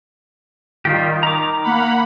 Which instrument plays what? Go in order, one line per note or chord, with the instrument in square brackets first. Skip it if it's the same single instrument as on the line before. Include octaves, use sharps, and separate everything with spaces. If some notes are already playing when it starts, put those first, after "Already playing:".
[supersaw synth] D#3 [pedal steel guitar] G3 F4 G4
[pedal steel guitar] A#5 D6
[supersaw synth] A#3 F#5 B5